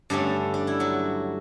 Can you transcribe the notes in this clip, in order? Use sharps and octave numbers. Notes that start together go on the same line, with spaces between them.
G2 D3 A3 C#4 D4
D4
E4
F#3 F#4